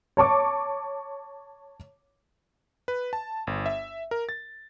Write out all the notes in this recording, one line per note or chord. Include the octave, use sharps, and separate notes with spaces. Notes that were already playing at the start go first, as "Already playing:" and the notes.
C#5 A5 C#6 D6
B4
A5
G1
E5
A#4
A6